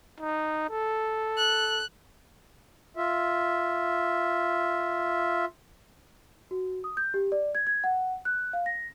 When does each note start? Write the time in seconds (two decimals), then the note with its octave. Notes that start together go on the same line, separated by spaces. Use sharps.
0.20 D#4
0.70 A4
1.37 F#6
2.96 F4 E5
6.51 F#4
6.84 D#6
6.97 G6
7.14 G4
7.32 D5
7.55 G#6
7.67 G#6
7.84 F#5
8.25 F#6
8.53 F5
8.66 A#6